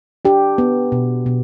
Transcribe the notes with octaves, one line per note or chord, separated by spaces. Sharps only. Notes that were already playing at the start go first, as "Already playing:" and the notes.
D4 G4
B3
B2
B2